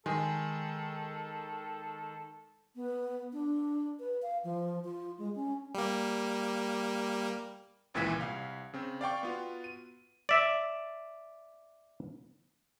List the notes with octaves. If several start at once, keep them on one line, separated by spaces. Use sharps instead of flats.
D#3 G#3 A4
B3
D4
B4
F5
F3
F4
G#3
C#4
G3 A#3
G#1 C#2 A#2 E3 G#6 B6
C2 F5
C#3 C4
D5 F5 G5 C#6
B3 F4 F#4
D#7
D5 E5